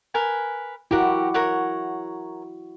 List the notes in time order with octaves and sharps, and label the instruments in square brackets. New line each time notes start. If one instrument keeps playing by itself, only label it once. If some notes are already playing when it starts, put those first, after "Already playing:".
[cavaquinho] A#4 B4 G#5
[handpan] E4 F#4 [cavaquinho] G4 A#4 F#5
[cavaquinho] A#4 C#5 F#5